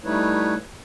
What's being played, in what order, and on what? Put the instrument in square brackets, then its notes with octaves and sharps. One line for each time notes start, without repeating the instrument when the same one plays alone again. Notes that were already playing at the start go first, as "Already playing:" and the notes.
[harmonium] G3 A3 D#4 E4 B4 C#5